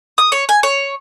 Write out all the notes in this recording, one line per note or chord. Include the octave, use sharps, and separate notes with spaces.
D#6
C#5
G#5
C#5